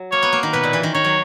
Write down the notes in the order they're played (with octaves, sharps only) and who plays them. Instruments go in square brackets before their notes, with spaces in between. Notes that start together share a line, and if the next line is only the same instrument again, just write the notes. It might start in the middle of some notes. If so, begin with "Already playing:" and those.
Already playing: [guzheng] F#3
[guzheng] A#3 [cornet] C#5
[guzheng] B3
A#3
D#3
[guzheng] B2 [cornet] B4
[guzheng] A#2
E3
D#3
[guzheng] D#3 [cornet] C#5
[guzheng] F#3